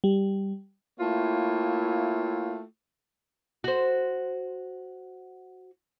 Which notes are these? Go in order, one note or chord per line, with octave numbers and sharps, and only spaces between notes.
G3
A3 A#3 E4 F4 C#5 G5
F#4 C5